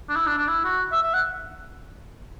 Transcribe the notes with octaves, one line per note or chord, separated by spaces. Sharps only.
D4
E4
D4
D4
E4
F#4
E5
E5
F#5